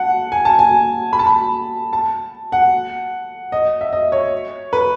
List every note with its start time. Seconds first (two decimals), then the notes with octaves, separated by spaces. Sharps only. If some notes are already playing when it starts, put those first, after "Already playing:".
Already playing: F#5 A5
0.32 G#5
0.45 A5
0.59 G#5
1.13 B5
1.19 A5
1.27 B5
1.93 A5
2.52 F#5
3.52 D#5
3.81 E5
3.93 D#5
4.12 C#5
4.73 B4